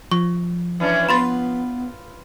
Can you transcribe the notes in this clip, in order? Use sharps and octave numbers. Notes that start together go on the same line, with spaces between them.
F3 C#6
E3 C#4 D4
B3 F4 B4 B5 C6 A6